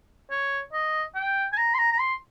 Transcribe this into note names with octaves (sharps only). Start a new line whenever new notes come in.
C#5
D#5
G5
G#5
A#5
C6
A#5
A#5
C6